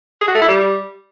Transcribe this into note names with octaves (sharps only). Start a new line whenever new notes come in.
G#4
F#4
A3
E4
G3